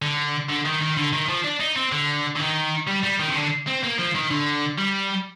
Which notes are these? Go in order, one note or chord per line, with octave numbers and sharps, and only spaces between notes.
D3
D3
D#3
D#3
D3
D#3
F3
D4
D#4
C4
D3
D3
D#3
G3
G3
D#3
C3
D3
C4
A#3
F3
D#3
D3
G3